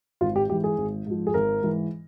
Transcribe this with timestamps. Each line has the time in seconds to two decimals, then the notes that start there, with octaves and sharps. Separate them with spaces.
0.21 G#1 F4
0.36 G4
0.50 G#2 E3 G4
0.64 G#4
0.78 G#1
1.06 G#2 F3
1.27 G#4
1.34 G#1 A#4
1.62 G#2 E3